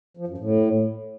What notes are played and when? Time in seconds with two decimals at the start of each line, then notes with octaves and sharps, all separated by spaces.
0.17 F3
0.27 F#2
0.38 A2